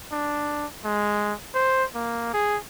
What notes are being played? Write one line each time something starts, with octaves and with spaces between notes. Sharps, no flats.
D4
G#3
C5
A#3
G#4